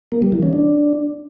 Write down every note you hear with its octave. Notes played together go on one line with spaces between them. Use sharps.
A#3
G3
E3
C#4
D4